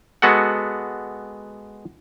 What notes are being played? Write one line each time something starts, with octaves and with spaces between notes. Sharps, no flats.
G#3 B3 F#4 A4 F#5